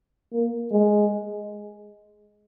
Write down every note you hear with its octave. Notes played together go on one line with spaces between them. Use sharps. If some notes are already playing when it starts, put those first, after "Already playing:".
A#3
G#3